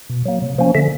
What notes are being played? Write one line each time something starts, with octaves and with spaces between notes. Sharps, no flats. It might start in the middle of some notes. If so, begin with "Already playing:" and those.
B2
F#3 A#3
C3
F3 A#3 C#4
D3 E5